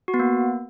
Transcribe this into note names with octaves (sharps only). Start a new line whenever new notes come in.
F#4
B3
A#3